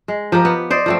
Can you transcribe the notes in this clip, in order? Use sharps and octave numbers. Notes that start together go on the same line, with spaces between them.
G#3
F3 G4 A#4
B3
C5 D5 D#5
F3 A3 C4